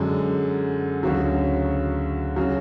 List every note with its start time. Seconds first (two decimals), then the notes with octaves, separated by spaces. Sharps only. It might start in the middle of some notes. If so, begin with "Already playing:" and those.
Already playing: F#2 D3 G#3
1.03 D2 C#3 F#3
2.36 C#3 F#3